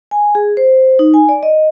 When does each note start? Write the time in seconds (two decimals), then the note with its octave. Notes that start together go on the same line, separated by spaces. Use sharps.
0.11 G#5
0.35 G#4
0.57 C5
0.99 D#4
1.14 G#5
1.29 D5
1.43 D#5